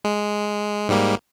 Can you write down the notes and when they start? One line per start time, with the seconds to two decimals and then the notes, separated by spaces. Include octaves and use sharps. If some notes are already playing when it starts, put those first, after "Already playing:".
0.05 G#3
0.89 G#2 G3 A#3